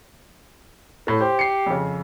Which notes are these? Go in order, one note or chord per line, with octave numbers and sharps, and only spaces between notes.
A2 A3
G4 C5
C7 C#7
F2 C#3